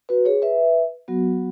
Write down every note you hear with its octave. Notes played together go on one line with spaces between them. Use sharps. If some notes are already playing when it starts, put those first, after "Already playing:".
F#4 B4
G#4 C#5
B4 E5
F#3 B3 F#4